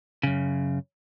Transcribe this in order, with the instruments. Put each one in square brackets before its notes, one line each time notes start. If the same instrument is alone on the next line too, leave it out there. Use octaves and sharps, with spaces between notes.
[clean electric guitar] F#2 C#3